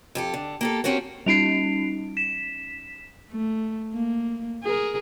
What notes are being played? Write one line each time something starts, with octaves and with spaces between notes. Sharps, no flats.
F2 G4 A4
D3
A#3 G4 A4
C4 C#4 F#4 G4 A#4
G3 C#4 D#4 C7 D7 F7
B6 E7
A3
A#3
G#4 A#4